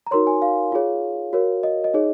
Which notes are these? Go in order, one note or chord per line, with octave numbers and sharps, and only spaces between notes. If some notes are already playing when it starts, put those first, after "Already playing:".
A#5
D#4 F#4 A#4 C#5 C6
G#5
F5
F4 G#4 C#5
F#4 A#4 C#5
D#5
D#5
D#4 G#4 C#5